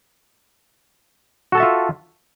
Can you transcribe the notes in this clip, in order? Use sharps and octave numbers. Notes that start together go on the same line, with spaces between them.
F4 F#4 A4 E5 A5